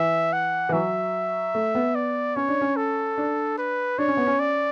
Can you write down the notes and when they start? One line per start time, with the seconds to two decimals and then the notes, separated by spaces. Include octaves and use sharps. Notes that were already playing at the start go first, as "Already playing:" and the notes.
Already playing: E3 E5
0.33 F#5
0.69 E3
0.73 F#3 E5
1.55 A3
1.75 B3
1.95 D5
2.36 C#4 C#5
2.48 D4
2.61 C#4
2.77 A4
3.18 D4
3.58 B4
3.98 D4 C#5
4.08 C#4
4.17 B3
4.27 C#4
4.40 D5